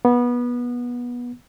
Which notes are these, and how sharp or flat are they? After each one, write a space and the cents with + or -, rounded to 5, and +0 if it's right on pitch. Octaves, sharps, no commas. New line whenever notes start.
B3 -20